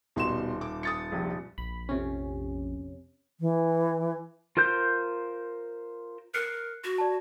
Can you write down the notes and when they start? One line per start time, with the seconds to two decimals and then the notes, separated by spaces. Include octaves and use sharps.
0.16 D#1 B2 G3 C6 E7
0.61 D6
0.83 D#6 A6 C#7
1.12 A#1 C3
1.58 A#1 B5
1.89 F2 C3 C#4
3.40 E3
4.57 F4 A#4 C5 G6
6.34 A#4 F#6 C7 C#7
6.84 F#4
6.98 D5 A5